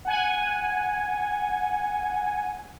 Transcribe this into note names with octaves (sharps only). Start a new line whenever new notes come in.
F#5 G#5